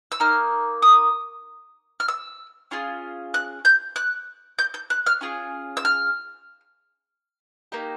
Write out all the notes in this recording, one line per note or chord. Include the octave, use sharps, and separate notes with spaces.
E6
A#3 D#4 F6
D#6
F6
E6
C#4 F4 G#4
F#6
G6
F#6
G6
G6
F#6
F6
C#4 F4 G#4
E6
F6
A#3 D#4 G4